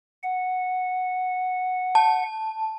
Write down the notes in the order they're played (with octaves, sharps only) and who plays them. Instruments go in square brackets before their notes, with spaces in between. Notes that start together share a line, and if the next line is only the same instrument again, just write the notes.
[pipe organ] F#5
[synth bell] A5